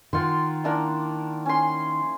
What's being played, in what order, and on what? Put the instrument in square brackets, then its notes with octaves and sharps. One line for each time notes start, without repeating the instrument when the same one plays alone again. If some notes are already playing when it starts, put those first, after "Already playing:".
[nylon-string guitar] D#3 [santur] F4 F#5 C6
[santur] A#3 D4 E4
C#4 C6